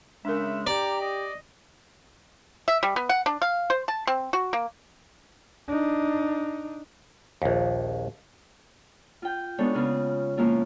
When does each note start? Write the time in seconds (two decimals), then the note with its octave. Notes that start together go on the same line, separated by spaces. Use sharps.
0.25 C#3 G#3 D4 A#4 E5
0.67 G4 D5 A#5
1.01 D#5
2.68 E5
2.83 G3
2.96 B3
3.09 F#5
3.26 D4
3.42 F5
3.70 C5
3.88 A5
4.07 C4
4.33 F#4
4.53 A#3
5.68 D4 D#4
7.42 A#1 D#2
9.22 F4 G5
9.58 G#3 B3 D4 D#4 A4 C#5
9.73 C#3 B3 F4 G#4
10.37 F3 G#3 A#3 C#4 E4 F4